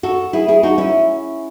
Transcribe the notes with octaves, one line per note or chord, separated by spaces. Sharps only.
F#4 A4
E4 G#4
E4 G#4
D#4 F#4
C#4 E4